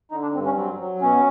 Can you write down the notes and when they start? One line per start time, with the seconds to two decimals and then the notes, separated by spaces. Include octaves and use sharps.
0.11 D3 D#4
0.22 D4
0.34 G2 C4
0.45 C#4
0.56 F#3 C4
0.80 F#3
1.02 B2 C#4